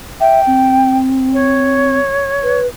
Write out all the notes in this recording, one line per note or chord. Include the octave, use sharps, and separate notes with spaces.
E5 G5
C4
C#5
B4